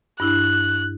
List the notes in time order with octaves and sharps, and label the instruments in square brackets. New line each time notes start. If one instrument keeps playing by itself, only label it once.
[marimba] G2 D4 E4 [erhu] F#6